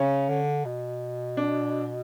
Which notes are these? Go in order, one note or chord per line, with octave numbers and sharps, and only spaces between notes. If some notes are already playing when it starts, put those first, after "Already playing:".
Already playing: C#3 C#4
D3
B2
D4